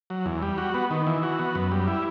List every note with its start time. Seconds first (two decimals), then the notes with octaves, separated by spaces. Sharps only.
0.10 F#3
0.26 E2
0.42 G3
0.58 F#4
0.74 B3
0.91 D#3
1.07 E3
1.23 F#4
1.39 B3
1.55 F#2
1.72 G3
1.88 E4